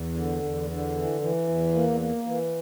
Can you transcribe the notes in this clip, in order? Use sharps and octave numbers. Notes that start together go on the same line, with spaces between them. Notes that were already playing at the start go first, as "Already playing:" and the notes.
Already playing: E2
D3
E2
D3
E3
E3
E2
A#3
A#3
E3